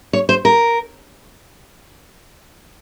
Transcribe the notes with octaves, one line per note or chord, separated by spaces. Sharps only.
C#5
C5
A#4